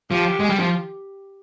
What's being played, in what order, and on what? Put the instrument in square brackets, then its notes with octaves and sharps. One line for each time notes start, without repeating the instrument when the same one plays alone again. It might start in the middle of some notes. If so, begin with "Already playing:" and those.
[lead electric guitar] F3 [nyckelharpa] G4
[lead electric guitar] G#3
G3
F3